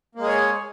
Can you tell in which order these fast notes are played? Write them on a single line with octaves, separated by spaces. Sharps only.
A#3 G#3 G#4 C#5